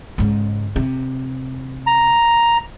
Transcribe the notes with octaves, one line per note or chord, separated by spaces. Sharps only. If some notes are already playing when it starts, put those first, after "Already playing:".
G#2 C#3
C3
A#5